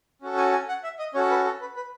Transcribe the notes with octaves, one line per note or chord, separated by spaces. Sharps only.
C#4 F#4 A4
G#5
G#5
F#5
E5
D#5
C#4 F#4 A4 C#5
B4
A4
B4
B4